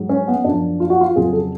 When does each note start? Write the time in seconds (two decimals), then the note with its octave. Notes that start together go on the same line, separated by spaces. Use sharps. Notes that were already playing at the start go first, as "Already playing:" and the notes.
Already playing: G#2 F#3
0.09 C#4
0.28 B3
0.44 F#2 F3 D4
0.80 F4
0.90 F#4
1.01 F4
1.16 F2 C#3 F#3 G#4
1.33 A4